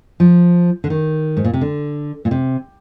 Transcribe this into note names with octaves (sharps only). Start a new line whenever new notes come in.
F3
D3
D#3
G#2
A#2
C3
D3
A#2
C3